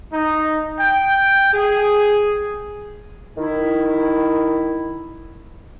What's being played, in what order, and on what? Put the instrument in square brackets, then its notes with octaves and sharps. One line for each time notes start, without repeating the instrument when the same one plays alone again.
[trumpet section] D#4
G5
G#4
[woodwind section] D#3 E4